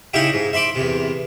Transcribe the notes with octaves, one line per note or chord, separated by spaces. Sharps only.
C#3 D#4 E4 G4 E5 G5
G#2
E5 B5 C6 D6
E2 C3